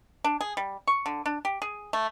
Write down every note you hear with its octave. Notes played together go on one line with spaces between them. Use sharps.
D4
G#4
G3
C#6
D3
D4
G4
G#4
A3